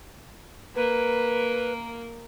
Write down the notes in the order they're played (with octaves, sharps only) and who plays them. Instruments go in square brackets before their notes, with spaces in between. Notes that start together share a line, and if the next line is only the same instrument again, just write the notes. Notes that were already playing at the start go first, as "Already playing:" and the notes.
[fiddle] A#3 A#4 [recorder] B4